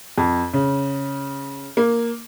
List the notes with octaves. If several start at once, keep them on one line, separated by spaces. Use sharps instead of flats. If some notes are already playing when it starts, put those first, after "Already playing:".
F2
C#3
A#3